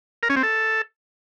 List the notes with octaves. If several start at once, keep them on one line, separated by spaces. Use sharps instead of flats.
A#4
C#4
C4
A4